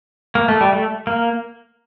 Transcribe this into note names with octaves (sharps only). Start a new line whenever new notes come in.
A#3
A3
G3
A3
A#3